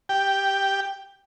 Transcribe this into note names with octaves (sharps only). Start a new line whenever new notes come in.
G4 G5